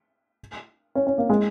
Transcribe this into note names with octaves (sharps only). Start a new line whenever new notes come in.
C#4
C#4
A#3
G#3